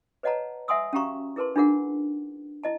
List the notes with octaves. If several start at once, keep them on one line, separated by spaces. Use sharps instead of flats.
B4 C#5 D#5 F#5 A5 A#5
E5 F#5 G#5 C6 D#6 E6
C#4 F#4 G4 F5 A#5 C#6
E4 G#4 A#4 B4 A5 C6
D4 D#4 F4 G#4 A#4 F#5
E4 D#5 A5